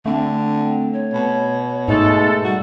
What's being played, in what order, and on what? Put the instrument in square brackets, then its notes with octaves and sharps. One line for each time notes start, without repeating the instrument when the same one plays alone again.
[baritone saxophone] D3 [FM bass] A3 [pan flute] C4
[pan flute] C#5
[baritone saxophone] B2
[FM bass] G#2 [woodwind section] G#3 A3 A4 [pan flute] D#4
[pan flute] G3 [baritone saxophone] F#4